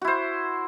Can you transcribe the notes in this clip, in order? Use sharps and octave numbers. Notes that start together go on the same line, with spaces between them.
E4 F#4 C5